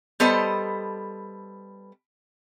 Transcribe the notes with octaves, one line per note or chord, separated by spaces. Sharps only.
G3 B3 A4 C5 D#5